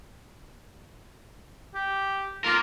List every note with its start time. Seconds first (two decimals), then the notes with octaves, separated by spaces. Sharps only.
1.74 G4
2.44 A#3 F4 A#4